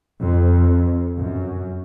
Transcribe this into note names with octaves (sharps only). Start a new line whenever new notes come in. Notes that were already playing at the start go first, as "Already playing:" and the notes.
F2
F#2